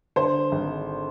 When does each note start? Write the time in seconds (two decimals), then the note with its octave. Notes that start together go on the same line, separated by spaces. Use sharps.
0.16 D3 C5
0.52 G#1